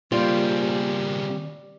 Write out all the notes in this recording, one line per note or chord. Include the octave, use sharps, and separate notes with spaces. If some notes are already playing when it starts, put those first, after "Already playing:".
C#3 G3 A#3 C4 F4